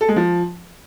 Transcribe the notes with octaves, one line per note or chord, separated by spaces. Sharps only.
A4
G#3
F3